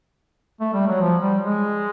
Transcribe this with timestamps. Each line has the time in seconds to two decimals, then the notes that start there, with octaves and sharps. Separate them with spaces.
0.60 A3
0.74 G3
0.88 F#3
1.01 F3
1.21 G3
1.43 G#3